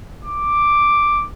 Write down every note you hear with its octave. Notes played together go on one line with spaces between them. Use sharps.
D6